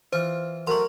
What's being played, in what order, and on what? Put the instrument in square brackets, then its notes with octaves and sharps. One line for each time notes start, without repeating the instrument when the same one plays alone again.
[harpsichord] E3 F4 [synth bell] C5
[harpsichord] F#2 A3 [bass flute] A#4 [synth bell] C6 C#6